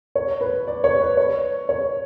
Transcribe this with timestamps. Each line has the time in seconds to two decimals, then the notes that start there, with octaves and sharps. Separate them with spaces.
0.15 C#5
0.41 B4
0.67 D5
0.84 C#5
1.01 B4
1.17 C#5
1.69 C#5